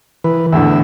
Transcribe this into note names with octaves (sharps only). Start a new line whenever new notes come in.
E3 B4
E2 A2 D3 E5